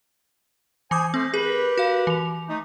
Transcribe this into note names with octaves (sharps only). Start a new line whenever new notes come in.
E3 C5 G#5 D6 D#6
A3 C4 A4 C5
G4 G#4 A#4 B4
F#4 F5
E3 F7
A3 D#4